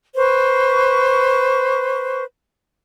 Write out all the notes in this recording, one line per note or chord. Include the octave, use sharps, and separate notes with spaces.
B4 C5 C#6